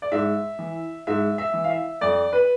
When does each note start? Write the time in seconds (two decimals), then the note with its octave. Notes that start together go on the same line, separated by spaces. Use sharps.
0.02 D5
0.12 G#2 E5
0.59 E3
1.07 G#2 E5
1.38 E5
1.54 E3
1.64 F5
1.70 E5
2.01 F2 D5
2.33 B4